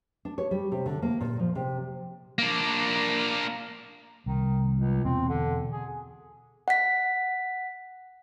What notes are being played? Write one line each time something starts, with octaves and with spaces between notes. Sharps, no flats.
D4
C#5
G3
C3
D3
A#3
A#2
F3
C3
A#3 D4
C2 D#3
C#2
E2 B2 C4
D3
G#4
F#5 B6